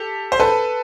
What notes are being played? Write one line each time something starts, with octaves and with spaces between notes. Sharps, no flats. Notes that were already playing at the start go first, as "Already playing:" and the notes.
Already playing: G4 A4
C5
A4 B4